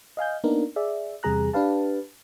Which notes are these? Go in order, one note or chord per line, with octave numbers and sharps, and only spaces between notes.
D#5 F5 G#5 G6
A#3 B3 D4 D#4 A#4
G#4 D5 E5
E2 C3 G3 G#4 A#5 F#6
D4 G4 B4 F5 A5